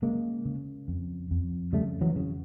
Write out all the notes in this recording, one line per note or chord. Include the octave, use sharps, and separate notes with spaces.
C#3 G#3 A#3
C#3
F2
F2
C#3 G3 A3
E3 F#3
C#3